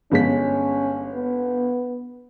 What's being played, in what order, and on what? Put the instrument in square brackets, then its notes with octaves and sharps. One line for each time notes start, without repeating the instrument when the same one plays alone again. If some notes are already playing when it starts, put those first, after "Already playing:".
[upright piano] G1 G#3 B6 [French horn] C#4
[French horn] B3